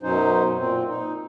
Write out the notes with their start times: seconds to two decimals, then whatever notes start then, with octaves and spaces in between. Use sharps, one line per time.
0.03 F#2 B2 F#3 C#4 D#4 C5
0.58 A#2 C4
0.89 D#4